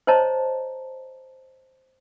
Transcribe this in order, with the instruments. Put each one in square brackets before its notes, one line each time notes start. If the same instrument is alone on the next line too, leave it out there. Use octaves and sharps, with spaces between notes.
[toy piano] C5 C#5 D#5 A5 A#5